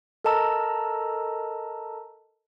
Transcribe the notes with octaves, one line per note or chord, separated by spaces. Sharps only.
A4 A#4 D#5 A5 A#5 E6